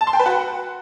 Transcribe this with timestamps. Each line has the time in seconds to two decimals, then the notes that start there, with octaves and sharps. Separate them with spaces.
0.01 A5
0.07 C6
0.13 G5
0.19 B4
0.26 F#4